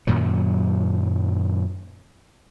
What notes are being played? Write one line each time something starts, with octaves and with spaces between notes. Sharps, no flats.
F#2 A#2 D#3 F#3